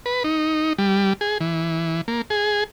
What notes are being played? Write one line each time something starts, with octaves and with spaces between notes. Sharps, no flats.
B4
D#4
G3
G#4
E3
A#3
G#4